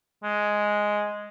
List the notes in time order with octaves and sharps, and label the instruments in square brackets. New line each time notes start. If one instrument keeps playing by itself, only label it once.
[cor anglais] G#3